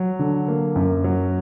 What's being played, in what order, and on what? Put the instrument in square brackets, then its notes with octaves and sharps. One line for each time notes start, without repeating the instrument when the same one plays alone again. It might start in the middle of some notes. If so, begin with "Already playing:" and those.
Already playing: [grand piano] F#3
D3
A#3
F#2
F#3